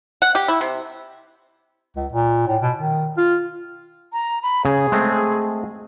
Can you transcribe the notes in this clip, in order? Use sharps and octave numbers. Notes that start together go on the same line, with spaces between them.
F#5
G4
E4
C3
C#2
A#2
A2
B2
D#3
F4
A#5
B5
C#3 G#4
G#3 A3 C4